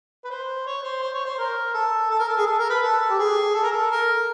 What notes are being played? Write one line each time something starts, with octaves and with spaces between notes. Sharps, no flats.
B4
C5
C#5
C5
C5
C#5
C5
A#4
A4
A4
A#4
A4
G#4
A4
A#4
B4
A4
G4
G#4
A4
A#4
A4
A#4